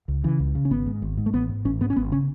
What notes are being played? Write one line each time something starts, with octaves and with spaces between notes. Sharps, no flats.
C#2
C#3 E3
C#2
C#3
C#4
G#1 B3
G#2
G#1
G#2
A3
A1 B3
G#2
A1 C#4
G#2 B3
C#4
G#1 B3
C#3 C#4